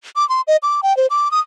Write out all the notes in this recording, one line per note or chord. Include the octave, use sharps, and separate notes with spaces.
D6
C6
D#5
D6
G5
C5
D6
D#6